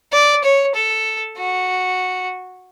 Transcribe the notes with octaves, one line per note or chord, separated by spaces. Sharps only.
D5
C#5
A4
F#4